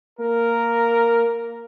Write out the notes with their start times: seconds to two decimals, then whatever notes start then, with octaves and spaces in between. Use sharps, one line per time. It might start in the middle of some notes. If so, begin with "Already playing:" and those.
0.19 A#3 A#4